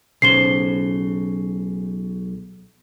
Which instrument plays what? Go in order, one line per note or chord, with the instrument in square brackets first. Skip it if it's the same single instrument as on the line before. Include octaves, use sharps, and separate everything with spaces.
[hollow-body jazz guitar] B1 C#3 C5 [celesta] C7 G7